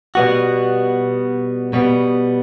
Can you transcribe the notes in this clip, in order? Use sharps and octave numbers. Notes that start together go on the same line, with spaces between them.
B2 G3 B3 F#4
B2 G3 B3